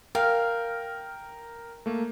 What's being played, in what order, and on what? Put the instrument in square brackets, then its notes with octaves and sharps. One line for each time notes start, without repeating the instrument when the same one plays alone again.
[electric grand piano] A#4 G5 [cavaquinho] F5
[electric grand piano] A3 A#3